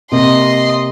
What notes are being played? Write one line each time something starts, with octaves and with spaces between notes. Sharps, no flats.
C3 A#3 D#5 C6